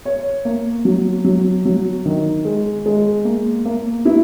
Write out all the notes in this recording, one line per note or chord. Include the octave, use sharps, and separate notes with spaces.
C#5
A#3
F#3
F#3
F#3
D#3
G#3
G#3
A#3
A#3
E4